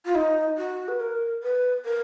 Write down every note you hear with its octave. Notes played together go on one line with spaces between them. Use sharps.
F4
D#4
F#4
B4
A#4
B4
A#4